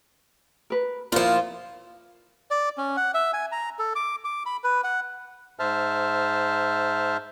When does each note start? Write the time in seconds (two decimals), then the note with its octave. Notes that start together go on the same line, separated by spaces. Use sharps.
0.70 A#4 B4
1.12 A#2 F3 E4 F4 C5 F5
2.51 D5
2.78 C#4
2.97 F#5
3.14 E5
3.33 G#5
3.52 A#5
3.79 A4
3.96 D6
4.24 D6
4.46 B5
4.64 B4
4.84 F#5
5.59 G#2 C5 E5 A5 F6